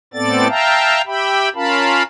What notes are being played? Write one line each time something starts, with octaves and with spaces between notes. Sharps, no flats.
A2 B3 C4 A4 D5 A6
E5 F5 G5 A5 A#5
G4 E5 G5 B5
C#4 F4 A#4 F5 A5 B5